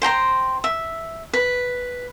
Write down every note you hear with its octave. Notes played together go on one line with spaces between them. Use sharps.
C5 G5 A#5 C6
E5
B4